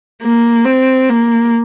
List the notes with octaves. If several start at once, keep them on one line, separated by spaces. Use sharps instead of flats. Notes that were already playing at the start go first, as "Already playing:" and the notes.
A#3
C4
A#3